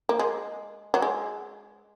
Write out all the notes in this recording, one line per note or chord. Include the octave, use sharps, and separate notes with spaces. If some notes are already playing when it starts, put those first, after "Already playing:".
A#3
G#3
F#3
G#3